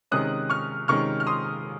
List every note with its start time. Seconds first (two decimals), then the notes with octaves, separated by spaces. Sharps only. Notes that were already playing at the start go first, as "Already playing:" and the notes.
0.11 C3 D#3 G#3 C#4 D#6 F#6
0.50 C#6 F6
0.88 C3 D#3 G#3 C#4 C#6 F6
1.20 F6
1.27 C6 D#6